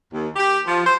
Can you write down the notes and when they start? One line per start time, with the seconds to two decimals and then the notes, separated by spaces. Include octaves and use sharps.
0.12 D#2
0.36 G4
0.66 F3
0.85 C5